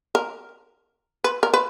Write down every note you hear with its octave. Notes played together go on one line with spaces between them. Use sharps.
A#4
B4
A#4
B4